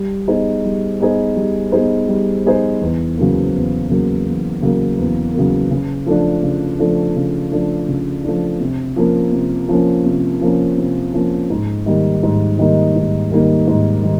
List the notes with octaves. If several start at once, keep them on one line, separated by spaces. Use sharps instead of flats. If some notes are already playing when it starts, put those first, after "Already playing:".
Already playing: G3
B3 D#4 G#4 C5
G3
B3 D#4 G#4 C5
G3
B3 D#4 G#4 C5
G3
B3 D#4 G#4 C5
E2
C#3 F#3 A#3
E2
C#3 F#3 A#3
E2
C#3 F#3 A#3
E2
C#3 F#3 A#3
C#3
F3 A3 D4
C#3
F3 A3 D4
C#3
F3 A3 D4
C#3
F3 A3 D4
C3
F3 A#3 C#4
C3
F3 A#3 C#4
C3
F3 A#3 C#4
C3
F3 A#3 C#4
G#2
D#3 G3 A#3 D#4
G#2
D#3 G3 A#3 D#4
G#2
D#3 G3 A#3 D#4
G#2
D#3 G3